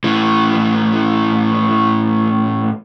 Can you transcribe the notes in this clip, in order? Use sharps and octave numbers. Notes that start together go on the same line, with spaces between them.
A2 E3